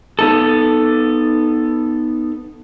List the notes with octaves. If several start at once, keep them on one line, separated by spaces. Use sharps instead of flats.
B3 D#4 A4